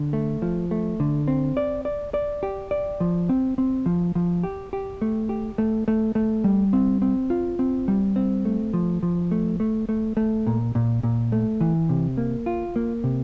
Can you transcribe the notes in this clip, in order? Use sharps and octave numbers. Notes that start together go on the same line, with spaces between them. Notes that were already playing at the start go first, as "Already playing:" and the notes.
Already playing: D3
A3
F3
A3
D3
C4
D5
D5
D5
G4
D5
F3
C4
C4
F3
F3
G4
G4
A3
G4
A3
A3
A3
G3
C4
C4
F4
C4
G3
C4
A3
F3
F3
A3
A3
A3
A3
A#2
A#2
A#2
A3
E3
C3
A#3
F4
A#3
C3